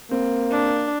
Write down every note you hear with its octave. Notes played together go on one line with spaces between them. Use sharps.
A#3 C4
D4